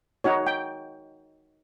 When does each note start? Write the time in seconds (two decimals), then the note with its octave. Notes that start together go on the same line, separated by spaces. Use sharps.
0.24 D#4 F#4 C#5
0.47 G5